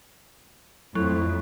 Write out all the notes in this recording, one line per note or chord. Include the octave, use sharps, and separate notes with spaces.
F2 A2 F#3 A3